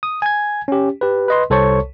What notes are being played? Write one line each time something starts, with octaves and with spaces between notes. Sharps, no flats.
D#6
G#5 G#6
C#4 G4
G4 B4
B4 D#5 C6
C2 A4 C5 C#5 A5 C#6